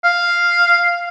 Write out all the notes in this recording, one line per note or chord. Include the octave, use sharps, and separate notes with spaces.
F5